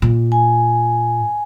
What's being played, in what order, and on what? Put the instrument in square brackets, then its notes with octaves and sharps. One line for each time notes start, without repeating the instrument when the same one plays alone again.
[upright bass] A#2
[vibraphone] G#5